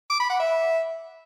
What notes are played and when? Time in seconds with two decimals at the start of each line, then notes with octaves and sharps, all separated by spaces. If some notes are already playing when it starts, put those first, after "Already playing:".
0.10 D6
0.20 B5
0.30 F#5
0.40 E5